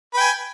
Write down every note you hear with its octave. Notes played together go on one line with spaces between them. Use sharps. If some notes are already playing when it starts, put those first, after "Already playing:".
B4 G5 G#5